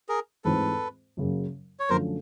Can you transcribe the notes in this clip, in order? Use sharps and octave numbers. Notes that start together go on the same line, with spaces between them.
G#4 A#4
G#2 E3 A3 C4 F4 A4 B4
F#2 C#3 F#3 A#3
C#5
F#2 D3 F3 A3 C#4 A#4 C5